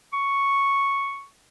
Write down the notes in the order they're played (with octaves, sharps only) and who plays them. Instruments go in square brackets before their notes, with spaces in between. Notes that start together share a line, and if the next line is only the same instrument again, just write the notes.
[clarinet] C#6